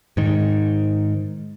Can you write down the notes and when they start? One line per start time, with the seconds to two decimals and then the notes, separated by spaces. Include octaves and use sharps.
0.17 G#2 D#3